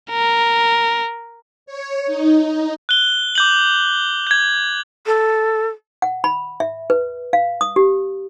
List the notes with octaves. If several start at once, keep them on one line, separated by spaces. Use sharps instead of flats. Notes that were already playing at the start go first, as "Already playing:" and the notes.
A#4
C#5
D#4
F#6 G7
D6 G6 F#7
G6 G#6
A4
F#5
B5
E5
B4
F5
D#6
G4